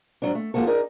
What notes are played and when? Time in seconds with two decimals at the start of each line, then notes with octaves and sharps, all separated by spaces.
0.22 G#2 F#3 D4
0.35 A3
0.54 F3 G#3 A#3 F#4 A4
0.67 D#4 G#4 A#4 D5